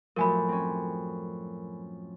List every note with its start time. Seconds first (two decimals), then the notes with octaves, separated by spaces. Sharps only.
0.16 F#2 A2 F3 A#4 G#5 B5
0.49 C4 C#4